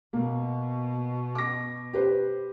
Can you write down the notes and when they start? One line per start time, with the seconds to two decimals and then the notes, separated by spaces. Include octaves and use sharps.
0.13 B2 A#3
1.35 D6 A#6
1.93 G4 B4 C5